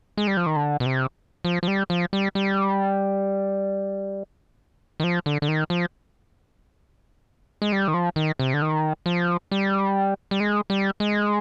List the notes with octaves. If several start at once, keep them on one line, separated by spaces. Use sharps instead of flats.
G#3
G3
F3
D#3
D3
B2
C3
F3
F3
G3
F3
G3
G3
D#3
F3
D3
D3
D#3
F3
G#3
G3
D#3
F3
D#3
C3
D3
D#3
F3
G3
G3
G#3
G3
G#3